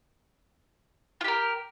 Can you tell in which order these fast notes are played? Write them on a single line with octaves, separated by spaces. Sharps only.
F4 G4 A#4